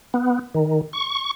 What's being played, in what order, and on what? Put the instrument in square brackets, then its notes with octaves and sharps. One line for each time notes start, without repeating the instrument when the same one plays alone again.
[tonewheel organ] B3
D#3
C#6